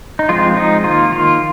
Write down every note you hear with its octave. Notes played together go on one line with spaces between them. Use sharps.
D#4
F3 G#3 C4 F4
D#4
D#3 A#3 F4
F4